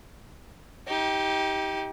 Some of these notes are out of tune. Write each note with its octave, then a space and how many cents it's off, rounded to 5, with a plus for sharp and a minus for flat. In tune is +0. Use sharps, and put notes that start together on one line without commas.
D#4 +35 G4 +0